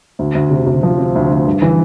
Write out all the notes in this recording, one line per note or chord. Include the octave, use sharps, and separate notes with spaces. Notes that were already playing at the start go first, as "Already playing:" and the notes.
D2
D2
C3
C3
F3
C4
D2
D2
G2
E3